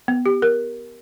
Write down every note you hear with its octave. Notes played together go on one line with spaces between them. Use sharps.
B3
G4
A#4